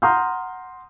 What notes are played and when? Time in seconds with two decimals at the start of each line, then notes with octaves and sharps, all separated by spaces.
0.02 F#5 A#5 C6 D#6 F6 G6